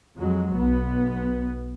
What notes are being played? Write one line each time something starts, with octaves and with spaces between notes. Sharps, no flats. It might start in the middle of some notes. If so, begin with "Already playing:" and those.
F2 F#3 G#3
B1 B3